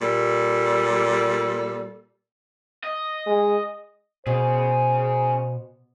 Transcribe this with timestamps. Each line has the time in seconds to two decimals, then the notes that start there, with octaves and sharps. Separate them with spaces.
0.02 A#2 G3 A4
2.84 D#5
3.27 G#3
4.27 B2 C#4 G#4 C5